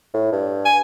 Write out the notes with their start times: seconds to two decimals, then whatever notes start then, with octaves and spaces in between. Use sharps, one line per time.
0.14 A2
0.33 G2
0.65 G#5